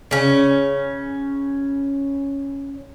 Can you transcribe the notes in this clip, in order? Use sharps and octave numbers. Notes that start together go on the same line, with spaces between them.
C#3 C#4